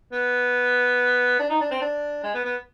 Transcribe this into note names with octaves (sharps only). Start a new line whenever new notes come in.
B3
D4
D#4
D4
C4
D4
G#3
B3
B3